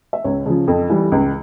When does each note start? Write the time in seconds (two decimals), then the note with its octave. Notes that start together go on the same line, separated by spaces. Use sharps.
0.13 E5
0.24 C#2 C#5
0.46 C#3 F3
0.68 F2
0.90 E3 G3
1.12 C#2